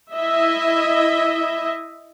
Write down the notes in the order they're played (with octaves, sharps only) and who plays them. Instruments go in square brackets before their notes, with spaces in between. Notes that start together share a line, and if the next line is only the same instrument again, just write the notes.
[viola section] E4 D#5 E5